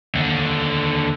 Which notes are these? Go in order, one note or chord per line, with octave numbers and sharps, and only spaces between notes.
D#2 D3